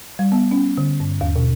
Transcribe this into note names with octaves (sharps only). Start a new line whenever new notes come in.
G3
B3
C#4
D3
G2
D#2
B2